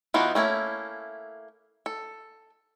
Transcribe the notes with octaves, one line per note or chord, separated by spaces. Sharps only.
E3 B3 D#4 F4 F#4
A3 A#3 C#4 E4
A4